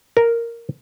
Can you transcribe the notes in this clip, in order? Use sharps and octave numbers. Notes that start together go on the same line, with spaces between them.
A#4